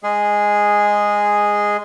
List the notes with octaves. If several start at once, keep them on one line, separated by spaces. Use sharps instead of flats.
G#3 G#4